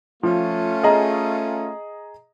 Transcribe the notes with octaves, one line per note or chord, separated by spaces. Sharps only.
F3 A3 C#4 F4
G#4 D#5 A#5